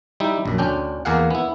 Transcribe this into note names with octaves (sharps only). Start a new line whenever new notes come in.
G3 D#4 E4
A#1 F#2
D2 C#4 D4 G5
E2 A#3 G#4 F5 F#5
B3 E4